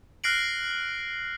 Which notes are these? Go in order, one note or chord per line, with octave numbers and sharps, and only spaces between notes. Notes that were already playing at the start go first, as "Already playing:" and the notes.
F6 F#6 A#6 C7 D7 F#7